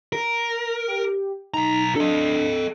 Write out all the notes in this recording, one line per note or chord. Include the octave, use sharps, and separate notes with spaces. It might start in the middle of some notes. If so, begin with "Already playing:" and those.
A#4
G4
B1 D#4 A#5
D4 A4 D#5